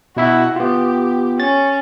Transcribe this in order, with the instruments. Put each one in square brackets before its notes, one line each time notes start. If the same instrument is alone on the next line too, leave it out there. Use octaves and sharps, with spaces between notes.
[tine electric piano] B2 E4 E5 [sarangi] F#4
[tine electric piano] B3 F4 [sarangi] G4
[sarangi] C#4 [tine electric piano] A6